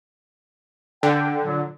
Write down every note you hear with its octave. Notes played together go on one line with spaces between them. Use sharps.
D3 G5
A#2 F#3